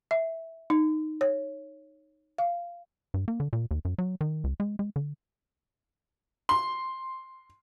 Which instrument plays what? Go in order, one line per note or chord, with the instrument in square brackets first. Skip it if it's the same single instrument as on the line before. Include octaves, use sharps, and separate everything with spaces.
[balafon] E5
D#4
C#5
F5
[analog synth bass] G2
A#3
D3
A#2
D#2
F#2
F#3
D#3
C#2
G#3
G#3
D3
[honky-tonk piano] C6